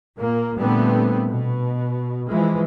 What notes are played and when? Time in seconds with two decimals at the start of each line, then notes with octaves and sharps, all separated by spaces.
0.18 A#2 A#3
0.58 A#2 D3 G3 A3 B3 C4
1.30 B2
2.29 E3 F3 G#3